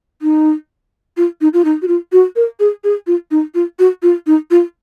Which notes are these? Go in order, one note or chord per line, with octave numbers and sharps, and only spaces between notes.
D#4
F4
D#4
F4
D#4
F#4
F4
F#4
A#4
G#4
G#4
F4
D#4
F4
F#4
F4
D#4
F4